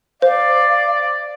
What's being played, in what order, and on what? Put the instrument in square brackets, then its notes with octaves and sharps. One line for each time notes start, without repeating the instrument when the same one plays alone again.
[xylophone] C5 [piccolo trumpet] D5 [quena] F5